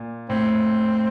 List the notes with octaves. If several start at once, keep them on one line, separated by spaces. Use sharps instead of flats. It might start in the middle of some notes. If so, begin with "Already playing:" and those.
Already playing: A#2
A2 C4